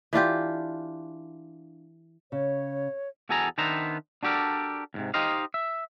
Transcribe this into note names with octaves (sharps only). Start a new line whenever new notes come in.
E3 D4 F4 G4
C#3 C#5
E2 F#4 G#4 A4 G#5 A#5
D#3 B3 D4 C5 E5 A#5
D4 F#4 G4 A4 A#4 D5
E2 G#2 C3
D#4 G4 C5 D#5 F5
E5